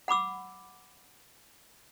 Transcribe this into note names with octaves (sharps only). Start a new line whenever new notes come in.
F#5 B5 D6 E6